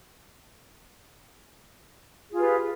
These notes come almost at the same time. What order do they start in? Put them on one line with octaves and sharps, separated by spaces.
G#4 F4 G4 B4